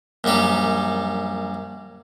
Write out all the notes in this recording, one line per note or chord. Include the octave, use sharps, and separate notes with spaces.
A#1 F#2 G3 G4 A5